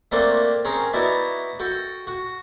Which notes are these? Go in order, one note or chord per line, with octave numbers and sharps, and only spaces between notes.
A3 A#3 C4 D4 A4 A#4
C4 C#4 G#4 A#4
B3 D#4 E4 F#4 D5 E5
F#4 A4 G5
F#4